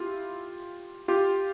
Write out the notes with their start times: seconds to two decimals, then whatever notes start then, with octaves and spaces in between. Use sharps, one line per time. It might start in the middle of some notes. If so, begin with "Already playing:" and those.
Already playing: E4 F4 G4
1.08 F4 G4